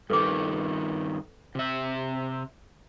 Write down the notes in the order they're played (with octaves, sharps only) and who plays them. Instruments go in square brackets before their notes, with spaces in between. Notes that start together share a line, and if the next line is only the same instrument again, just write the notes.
[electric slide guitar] G2 D#3 [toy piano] A4 B4 D6
[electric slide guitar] C3 E5